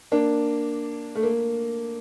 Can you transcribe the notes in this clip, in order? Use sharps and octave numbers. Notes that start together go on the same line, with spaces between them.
A#3 D4
A3
A#3